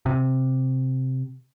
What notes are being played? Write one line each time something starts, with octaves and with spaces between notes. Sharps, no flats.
C3